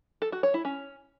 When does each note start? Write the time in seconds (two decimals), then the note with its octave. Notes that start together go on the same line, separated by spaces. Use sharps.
0.22 A4
0.32 F#4
0.43 C#5
0.54 E4
0.65 C#4